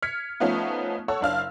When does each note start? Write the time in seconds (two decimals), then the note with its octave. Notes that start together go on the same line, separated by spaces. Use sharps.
0.02 F6 G#6 B6 C#7
0.40 F3 A3 B3 C#4 D#4 F4
1.08 A4 C#5 F#5 E6
1.21 F#1 D4 F5 F6